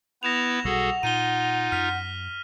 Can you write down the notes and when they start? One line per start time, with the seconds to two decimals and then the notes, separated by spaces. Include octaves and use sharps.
0.23 B3 E4 B4 A#6 E7 F7
0.65 B1 B2 G3 F#4 G#4 A4 F#5
1.03 A#2 D#4 F4 D#7 G7
1.72 F#2 F6 B6